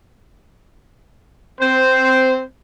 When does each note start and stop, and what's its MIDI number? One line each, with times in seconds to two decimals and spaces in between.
1.61 2.43 60
1.61 2.43 72